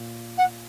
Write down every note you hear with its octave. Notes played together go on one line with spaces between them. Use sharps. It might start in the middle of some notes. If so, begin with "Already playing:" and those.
Already playing: A#2
F#5